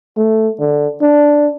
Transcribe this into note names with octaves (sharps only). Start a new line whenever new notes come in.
A3
D3
D4